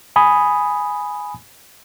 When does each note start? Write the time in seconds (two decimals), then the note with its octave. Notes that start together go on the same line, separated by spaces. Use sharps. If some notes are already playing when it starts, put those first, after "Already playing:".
0.16 G#5 B5 D#6